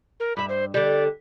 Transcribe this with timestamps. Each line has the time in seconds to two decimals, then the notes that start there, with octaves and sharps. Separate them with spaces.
0.20 A#4
0.37 G2 E5 B5
0.49 C5
0.74 D3 G3 D5